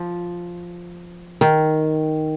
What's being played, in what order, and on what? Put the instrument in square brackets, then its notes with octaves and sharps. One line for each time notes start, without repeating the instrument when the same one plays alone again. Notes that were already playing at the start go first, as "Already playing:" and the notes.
Already playing: [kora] F3
D#3